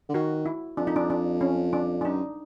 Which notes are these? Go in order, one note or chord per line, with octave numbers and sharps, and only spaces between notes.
D3
D#3 F#4
E4
F2 D4
D#4
D4
D4
C#4
D4
D4
F#2 D#4